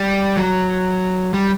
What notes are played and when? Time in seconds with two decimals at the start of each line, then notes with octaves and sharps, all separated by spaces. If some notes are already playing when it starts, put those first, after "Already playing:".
Already playing: G3
0.37 F#3
1.34 G3